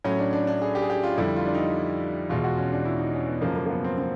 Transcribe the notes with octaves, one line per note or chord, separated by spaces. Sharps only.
A2 F#3 C#4
D4
D4
D4
G#4
G4
G#4
G4
F4
F2 D3 G3 E4
F4
D4
D#4
E2 B2 G#3 F4
F#4
C#4
D4
E4
D#4
C#4
B3
F#2 C#3 F3 G#3 A#3
A#3
A#3
B3
C4
C4